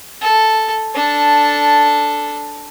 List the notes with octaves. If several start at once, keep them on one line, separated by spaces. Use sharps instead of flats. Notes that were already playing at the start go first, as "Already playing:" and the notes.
A4
D4 A4